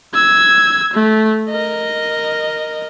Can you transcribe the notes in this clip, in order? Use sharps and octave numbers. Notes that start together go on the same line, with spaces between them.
E6 G#6
A3
A#4 D#5